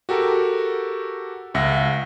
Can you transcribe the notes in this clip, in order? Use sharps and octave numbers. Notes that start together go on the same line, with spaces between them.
F#4 G4 A4 A#4
C#2 E5 F#5 A#6